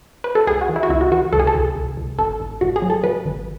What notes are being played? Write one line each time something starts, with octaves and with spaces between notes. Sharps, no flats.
B4
A4
C#2 G#4
F#4
E3
E4
F#4
C#2 E4
F#4
E3 F#4
C#2 A4
G#4
A4
C#2
C#2
C#2
G#1 A4
G#1
G#1 F#4
G#4
F#3
A4
F#3 B4
G#1